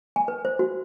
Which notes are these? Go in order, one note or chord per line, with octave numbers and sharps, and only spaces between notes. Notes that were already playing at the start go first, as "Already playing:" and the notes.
G#5
B4
C5
F#4